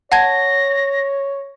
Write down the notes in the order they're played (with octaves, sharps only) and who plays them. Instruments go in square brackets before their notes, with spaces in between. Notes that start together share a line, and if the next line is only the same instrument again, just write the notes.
[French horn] C#5 [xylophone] F#5 A5 G#6 [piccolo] A#6